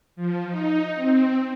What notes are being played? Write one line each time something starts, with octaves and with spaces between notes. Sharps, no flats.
F3
D#4
C4